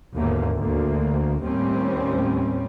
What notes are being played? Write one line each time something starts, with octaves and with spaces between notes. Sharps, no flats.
D#2 G#2 B2 D3 A3 A#3
D2 A#3
D#2 A2 G3 C4 C#4